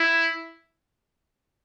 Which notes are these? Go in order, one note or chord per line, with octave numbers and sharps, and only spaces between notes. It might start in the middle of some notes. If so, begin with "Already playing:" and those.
Already playing: E4